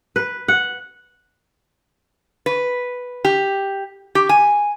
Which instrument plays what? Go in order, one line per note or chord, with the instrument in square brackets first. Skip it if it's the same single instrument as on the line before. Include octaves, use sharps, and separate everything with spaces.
[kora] B4
F#5
[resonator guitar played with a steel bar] B4
G4
G4
G#5